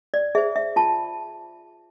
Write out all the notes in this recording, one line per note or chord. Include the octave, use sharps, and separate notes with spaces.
D5
G#4 C5 E5
E5
F4 A5